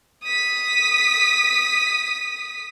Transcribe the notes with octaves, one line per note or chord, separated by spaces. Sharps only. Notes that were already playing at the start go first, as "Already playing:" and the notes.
D#6 B6